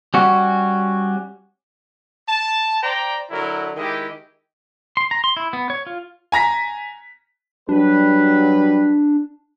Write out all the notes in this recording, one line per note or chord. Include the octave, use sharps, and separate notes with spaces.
G3 C#4 F#4
A5
C5 D5 G5 A#5
D3 F#3 E4 A#4
D#3 G#3 E4 G4 D#5
C6
A#5
C6
E4
B3
C#5
F4
G#5 A#5 A#6 B6
F#3 G3 D4 B4